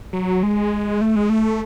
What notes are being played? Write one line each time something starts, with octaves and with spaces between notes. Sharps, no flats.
F#3
G#3
A3
G#3
A3